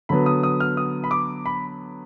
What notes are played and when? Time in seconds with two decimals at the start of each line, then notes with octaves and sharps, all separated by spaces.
0.09 D3 F#3 B3 B5
0.26 D#6
0.43 D#6
0.60 F6
0.77 D#6
1.04 B5
1.11 D6
1.46 B5